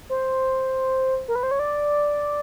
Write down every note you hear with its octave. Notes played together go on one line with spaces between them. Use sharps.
C5
A#4
B4
C5
C#5
D5